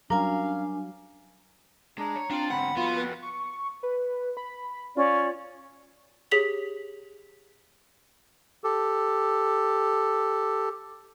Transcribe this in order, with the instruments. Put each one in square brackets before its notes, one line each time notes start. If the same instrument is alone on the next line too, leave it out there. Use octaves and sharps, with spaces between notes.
[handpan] F#3 G3 [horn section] C#4 F5 [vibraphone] D4 G#5 [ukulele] A#4
[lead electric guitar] G#3 [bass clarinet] D4 [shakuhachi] A#5
[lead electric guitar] C#5
[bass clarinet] C4 [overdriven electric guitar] D4 [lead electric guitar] F4
[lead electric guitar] G#2 D3 [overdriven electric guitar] F#5 [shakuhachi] B5
[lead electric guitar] F2 F#4 [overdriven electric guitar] B3 [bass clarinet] F4
[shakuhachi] B4
[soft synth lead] C#6
B4
B5
[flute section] C#4 D5 [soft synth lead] F4
[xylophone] G4 G#4 C#5 B6 F7 F#7
[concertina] G4 A4